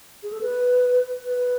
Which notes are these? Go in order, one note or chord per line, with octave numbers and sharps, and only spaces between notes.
G#4
A4
B4
B4